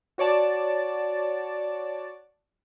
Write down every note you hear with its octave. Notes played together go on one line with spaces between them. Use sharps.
F#4 C#5 D5 A5